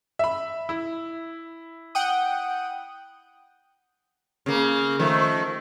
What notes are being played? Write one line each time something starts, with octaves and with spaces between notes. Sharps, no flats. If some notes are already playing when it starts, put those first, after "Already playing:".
E5 B5
E4
F#5 G5 D#6
C#3 A#3
D#3 F3 A3